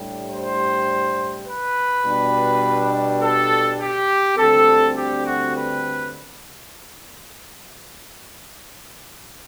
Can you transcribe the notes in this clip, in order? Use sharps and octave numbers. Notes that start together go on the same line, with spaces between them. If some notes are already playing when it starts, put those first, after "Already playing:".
Already playing: A2 G3 D4
C5
B4
B2 G3 D4
A4
G4
D2 D3 G3 C4 A4
G4
F#4
B4